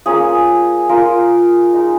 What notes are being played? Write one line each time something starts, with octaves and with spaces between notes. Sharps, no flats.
A#3 C#4 F4 G#4
F4 A#4
G#3 D#4